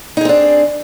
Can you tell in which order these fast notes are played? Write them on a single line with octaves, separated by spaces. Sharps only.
D#4 G#4 C4 D4